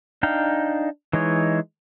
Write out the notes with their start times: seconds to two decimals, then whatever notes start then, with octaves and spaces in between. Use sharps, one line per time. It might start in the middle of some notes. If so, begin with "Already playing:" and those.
0.23 D4 D#4 F5 G5
1.13 E3 G#3 D#4 C#5